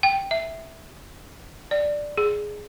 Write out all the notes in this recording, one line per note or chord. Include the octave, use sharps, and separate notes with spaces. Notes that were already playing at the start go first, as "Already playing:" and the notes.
G5
E5
D5
G#4